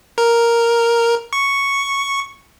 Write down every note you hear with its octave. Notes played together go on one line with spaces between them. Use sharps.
A#4
C#6